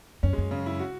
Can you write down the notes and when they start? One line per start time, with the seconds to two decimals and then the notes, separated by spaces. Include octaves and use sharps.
0.23 F#2 C#4
0.33 G#3
0.38 F#2
0.51 C#3
0.66 E4
0.79 F#4